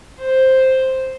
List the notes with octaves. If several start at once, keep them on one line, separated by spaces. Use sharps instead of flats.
C5